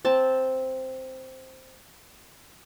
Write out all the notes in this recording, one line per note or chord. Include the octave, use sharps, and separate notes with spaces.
C4 A5